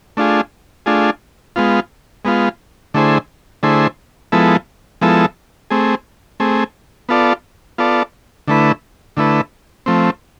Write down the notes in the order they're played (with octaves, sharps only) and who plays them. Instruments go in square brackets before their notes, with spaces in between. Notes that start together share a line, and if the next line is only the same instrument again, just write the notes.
[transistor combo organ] A3 D4 F4 G#4
A3 D4 F4 G#4
G#3 B3 F4
G#3 B3 F4
D3 A3 E4 G#4 C5
D3 A3 E4 G#4 C5
F3 G#3 B3 E4 A4
F3 G#3 B3 E4 A4
A3 C4 G#4
A3 C4 G#4
B3 F4 A4 D5
B3 F4 A4 D5
D3 A3 E4 B4
D3 A3 E4 B4
F3 A3 C4